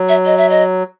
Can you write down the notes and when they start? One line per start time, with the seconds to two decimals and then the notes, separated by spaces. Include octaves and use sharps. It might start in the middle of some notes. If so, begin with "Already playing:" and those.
Already playing: F#3
0.09 E5
0.26 D#5
0.37 E5
0.50 D#5